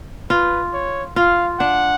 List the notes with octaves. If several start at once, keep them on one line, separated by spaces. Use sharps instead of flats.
F4 B4
C#5
F4 F5
D4 F#5